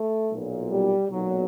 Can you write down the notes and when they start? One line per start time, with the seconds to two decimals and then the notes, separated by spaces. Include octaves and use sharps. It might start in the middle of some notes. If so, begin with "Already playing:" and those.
Already playing: A3
0.31 B1 A#2
0.70 G3
1.09 B1 A#2 F#3